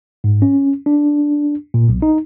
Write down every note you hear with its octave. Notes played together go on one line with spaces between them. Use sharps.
G#2
C#4
D4
A#2
B1
D#4